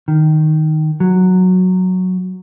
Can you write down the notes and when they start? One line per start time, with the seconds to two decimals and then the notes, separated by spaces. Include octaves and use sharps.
0.08 D#3
1.00 F#3